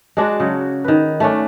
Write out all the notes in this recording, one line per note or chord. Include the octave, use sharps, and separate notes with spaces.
G#3 D4 F#4
C#3 F#3
D#3 B4
A3 C#4 D4